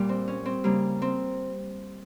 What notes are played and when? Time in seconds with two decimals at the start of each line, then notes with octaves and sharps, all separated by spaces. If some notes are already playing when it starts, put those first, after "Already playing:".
Already playing: A#2 G3
0.09 C4
0.28 C#4
0.46 C4
0.64 C#3 G3 A#3
1.02 C4